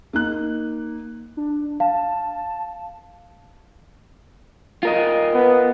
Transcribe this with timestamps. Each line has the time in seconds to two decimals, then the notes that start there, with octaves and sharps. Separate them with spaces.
0.13 A#3 D#4 F#6
1.37 D4
1.80 F5 A5
4.83 F4 A#4 D#5
5.34 B3